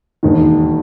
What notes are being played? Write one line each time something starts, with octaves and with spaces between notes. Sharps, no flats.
E1 D#2 D#3